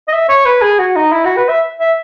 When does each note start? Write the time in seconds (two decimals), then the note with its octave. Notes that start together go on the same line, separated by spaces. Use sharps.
0.08 D#5
0.13 E5
0.29 C#5
0.45 B4
0.62 G#4
0.79 F#4
0.96 D#4
1.12 E4
1.25 F#4
1.37 B4
1.49 E5
1.79 E5